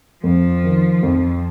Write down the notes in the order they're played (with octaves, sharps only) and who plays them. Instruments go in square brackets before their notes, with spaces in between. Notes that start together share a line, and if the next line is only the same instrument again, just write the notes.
[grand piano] F2 [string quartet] F3
[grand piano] D#3
F2